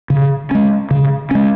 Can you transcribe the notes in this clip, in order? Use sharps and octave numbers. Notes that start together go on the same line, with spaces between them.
C#3
G#3 C#4
C#3
G#3 C#4